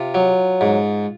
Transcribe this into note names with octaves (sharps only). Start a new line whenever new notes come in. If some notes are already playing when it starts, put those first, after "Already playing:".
Already playing: C3 F4
F#3
G#2